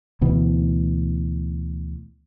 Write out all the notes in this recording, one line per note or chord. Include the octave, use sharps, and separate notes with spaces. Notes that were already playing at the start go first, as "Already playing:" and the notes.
D2 B2 E3